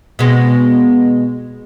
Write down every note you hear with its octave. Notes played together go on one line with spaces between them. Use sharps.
B2 G#3